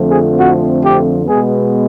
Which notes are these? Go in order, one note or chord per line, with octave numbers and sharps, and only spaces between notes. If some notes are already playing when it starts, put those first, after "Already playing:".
Already playing: F2 D3 F3 A3 C4
G#4
F#4
G4
B2 G#3 B3 G#4